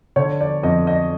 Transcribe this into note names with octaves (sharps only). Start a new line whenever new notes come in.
D3 C#5
D5
F2 D#5
D#5